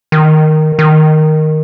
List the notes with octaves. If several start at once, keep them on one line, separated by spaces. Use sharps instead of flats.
D#3
D#3